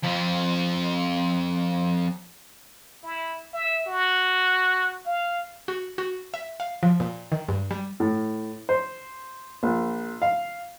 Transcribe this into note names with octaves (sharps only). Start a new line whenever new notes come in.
F2 F3
E4
E5
F#4
F5
F#4
F#4
E5
F5
F3
A#2
D#3
G2
G3
A2
C5
A#1
F5